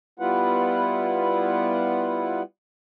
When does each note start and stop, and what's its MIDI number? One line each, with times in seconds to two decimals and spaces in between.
0.19 2.42 55
0.19 2.42 59
0.19 2.42 64
0.19 2.42 65
0.19 2.42 71
0.19 2.42 78